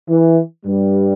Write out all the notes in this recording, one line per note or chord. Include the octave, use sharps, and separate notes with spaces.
E3
G2 G3